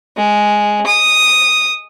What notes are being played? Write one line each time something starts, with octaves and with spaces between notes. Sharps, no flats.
G#3
D#6